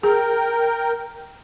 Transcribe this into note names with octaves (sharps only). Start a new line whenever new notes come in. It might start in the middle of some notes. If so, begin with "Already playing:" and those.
G#4 A#4 G5